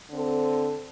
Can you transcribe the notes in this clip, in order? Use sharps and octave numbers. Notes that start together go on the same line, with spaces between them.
D3 C4 A4